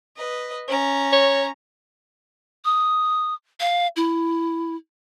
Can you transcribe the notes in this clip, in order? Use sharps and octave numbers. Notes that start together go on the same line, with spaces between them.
B4 D#5
C#4 A#5
C#5
D#6
F5
E4